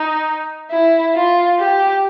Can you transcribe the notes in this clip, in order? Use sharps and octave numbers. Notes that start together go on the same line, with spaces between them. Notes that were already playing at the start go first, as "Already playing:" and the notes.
Already playing: D#4
E4
F4
G4